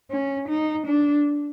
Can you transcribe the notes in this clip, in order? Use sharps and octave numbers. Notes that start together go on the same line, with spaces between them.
C#4
D#4
D4